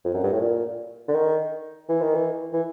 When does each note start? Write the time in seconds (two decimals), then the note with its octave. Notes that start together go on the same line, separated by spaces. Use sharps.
0.05 F2
0.14 F#2
0.23 G2
0.33 A2
0.42 A#2
1.08 D3
1.15 D#3
1.89 E3
2.02 D#3
2.15 E3
2.53 E3